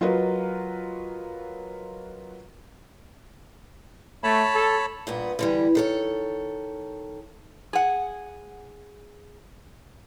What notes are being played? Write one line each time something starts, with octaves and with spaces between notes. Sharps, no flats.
F#3 F4 F#4 A#4 B4 D#5
A3 C#5 A5 B5
A4
G2 A#2 B3
D3 E3 G3
D#3 A4 C#5
G#4 F#5